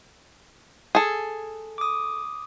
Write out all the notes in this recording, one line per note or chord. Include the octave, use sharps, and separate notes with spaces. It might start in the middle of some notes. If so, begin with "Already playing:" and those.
G#4 A4
D6 D#6